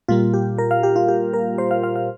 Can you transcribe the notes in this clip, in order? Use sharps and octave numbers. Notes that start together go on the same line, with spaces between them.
A#2 G3 A#3 F4
G4
A#4
F5
G4
F4
G4
A#4
C5
F5
F5
F5